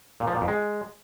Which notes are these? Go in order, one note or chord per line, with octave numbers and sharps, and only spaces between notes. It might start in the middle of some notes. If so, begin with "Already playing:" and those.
A#2
F3
A#2
F2
G#3